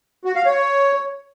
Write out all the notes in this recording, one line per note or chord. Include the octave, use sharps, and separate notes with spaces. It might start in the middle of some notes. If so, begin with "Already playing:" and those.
F#4
F5
C#5